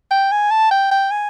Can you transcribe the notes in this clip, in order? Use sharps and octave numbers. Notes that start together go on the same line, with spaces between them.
G5
G#5
A5
G5
G5
G#5